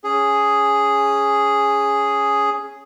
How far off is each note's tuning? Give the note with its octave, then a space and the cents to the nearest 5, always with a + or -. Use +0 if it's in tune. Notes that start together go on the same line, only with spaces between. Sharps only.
C#4 +0 G#4 +0